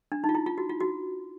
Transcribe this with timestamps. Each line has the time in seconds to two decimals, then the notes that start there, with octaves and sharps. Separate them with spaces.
0.12 D4
0.24 D#4
0.29 F4
0.35 E4
0.46 F4
0.58 F#4
0.69 F4
0.80 F#4